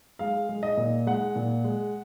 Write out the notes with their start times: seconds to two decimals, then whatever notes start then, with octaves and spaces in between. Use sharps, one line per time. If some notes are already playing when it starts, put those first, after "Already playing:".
0.19 G#3 F5
0.49 G#3
0.63 D#5
0.77 A#2
1.07 G#3 F#5
1.36 A#2
1.64 G#3